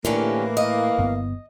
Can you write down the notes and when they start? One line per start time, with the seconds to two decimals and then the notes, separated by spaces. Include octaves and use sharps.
0.05 A2 D3 E3 A#3 C#4 G4
0.57 D#5 F5
0.98 G1 G2 B3